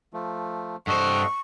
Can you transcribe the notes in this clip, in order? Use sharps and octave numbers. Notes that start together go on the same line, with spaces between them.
F3 A3
G2 A4 C5 D#5 F#5 C#6